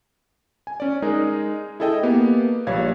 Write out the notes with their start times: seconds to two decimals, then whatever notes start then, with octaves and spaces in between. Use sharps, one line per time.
0.67 G#5
0.80 C#4 D5
1.02 G#3 D#4 G#4 A#4
1.80 E4 G#4 A4 D#5 G5
2.03 A#3 B3 G4
2.67 A#1 G3 C#5 F5 G#6